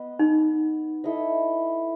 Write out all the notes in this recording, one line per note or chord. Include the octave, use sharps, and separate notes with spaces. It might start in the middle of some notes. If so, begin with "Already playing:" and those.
Already playing: B3 D#5
D#4
E4 A4 D#5